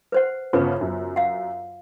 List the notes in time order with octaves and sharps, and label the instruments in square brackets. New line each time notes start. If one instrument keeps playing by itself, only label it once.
[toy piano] B4 C5 F#5
[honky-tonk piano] G1 C#3 B3 [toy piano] F4 B4
[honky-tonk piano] F#2
[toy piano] F5 F#5